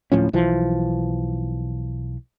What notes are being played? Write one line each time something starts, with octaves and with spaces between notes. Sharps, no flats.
D1 A2 F3 C#4
B1 E3 F3